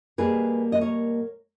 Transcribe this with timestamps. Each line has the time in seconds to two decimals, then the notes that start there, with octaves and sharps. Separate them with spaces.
0.18 B2 G3 A#3 G#4 B4
0.72 D#5
0.81 A#4 C#5